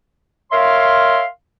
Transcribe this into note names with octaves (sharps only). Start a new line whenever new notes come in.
A#4 C#5 E5 F5 C6